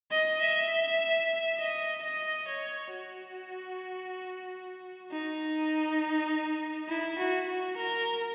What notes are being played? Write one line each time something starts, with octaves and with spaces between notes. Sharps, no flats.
D#5
E5
D#5
D#5
C#5
F#4
D#4
E4
F#4
F#4
A#4